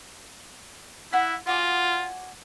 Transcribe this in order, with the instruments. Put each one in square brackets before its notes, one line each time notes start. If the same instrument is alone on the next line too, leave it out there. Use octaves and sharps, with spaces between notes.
[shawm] E4 [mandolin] F#4 F#5 B5
[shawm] F4 [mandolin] F#4 D5 G#5